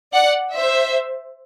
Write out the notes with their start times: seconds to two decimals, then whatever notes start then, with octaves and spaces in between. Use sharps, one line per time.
0.14 D5 F#5
0.55 C5 E5